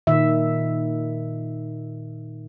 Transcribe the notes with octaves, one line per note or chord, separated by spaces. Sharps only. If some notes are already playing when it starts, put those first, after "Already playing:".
A#2 D#3 E5